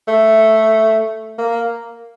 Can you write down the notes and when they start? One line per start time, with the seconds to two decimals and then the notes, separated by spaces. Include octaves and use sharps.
0.08 A3
1.38 A#3